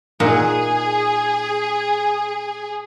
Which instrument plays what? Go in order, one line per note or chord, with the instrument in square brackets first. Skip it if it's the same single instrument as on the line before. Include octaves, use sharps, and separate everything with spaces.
[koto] A#2 D#4 F#5 [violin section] G#4